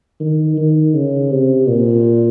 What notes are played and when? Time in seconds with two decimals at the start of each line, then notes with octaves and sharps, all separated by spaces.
0.20 D#3
0.57 D#3
0.94 C#3
1.31 C3
1.67 A#2